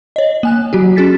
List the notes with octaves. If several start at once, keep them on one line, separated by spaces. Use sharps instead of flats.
C#5 D#5
A#3 G#5 F#6
F#3 F#4 G4
C#4 F#4 G#4 A6 B6